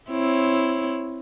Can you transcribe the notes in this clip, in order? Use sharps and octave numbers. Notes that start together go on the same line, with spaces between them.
C4 E4 C#5